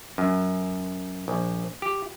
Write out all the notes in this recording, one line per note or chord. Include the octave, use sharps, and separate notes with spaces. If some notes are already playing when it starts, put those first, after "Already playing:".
F#2
A#1
G4